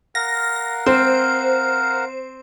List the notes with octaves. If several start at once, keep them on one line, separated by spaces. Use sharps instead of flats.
A#4 F5 F#5 A#6
C4 C5